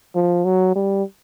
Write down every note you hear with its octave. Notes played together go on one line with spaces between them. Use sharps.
F3
F#3
G3